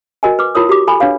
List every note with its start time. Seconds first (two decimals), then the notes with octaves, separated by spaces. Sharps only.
0.23 F#4 A#4 D#5 G#5
0.39 B4 D6
0.55 E4 F4 A#4 C#5 D#6
0.69 F#4 G4 D6
0.87 A4 G#5 B5
1.00 D4 B4 C#5 F5